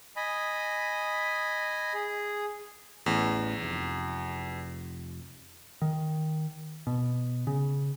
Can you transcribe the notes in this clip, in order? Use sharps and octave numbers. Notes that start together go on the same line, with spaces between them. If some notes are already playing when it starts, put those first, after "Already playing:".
D#5 G#5 B5
G#4
A1 E2
F1
D#3
B2
C#3